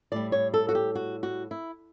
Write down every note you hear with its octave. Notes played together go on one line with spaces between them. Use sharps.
A2 G3 D5
C#5
A4
F#4
G4
F#4
F#4
E4